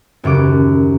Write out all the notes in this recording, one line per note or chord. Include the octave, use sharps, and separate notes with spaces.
D#1 F#2 C#3 D6